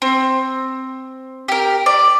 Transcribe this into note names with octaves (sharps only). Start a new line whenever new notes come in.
C4
G4 A#4
D5